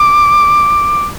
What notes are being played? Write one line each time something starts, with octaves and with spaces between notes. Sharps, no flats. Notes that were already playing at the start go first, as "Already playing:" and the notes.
Already playing: D6